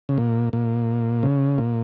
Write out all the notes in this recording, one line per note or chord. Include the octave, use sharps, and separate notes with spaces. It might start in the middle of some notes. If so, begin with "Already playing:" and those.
C#3
A#2
A#2
C#3
A#2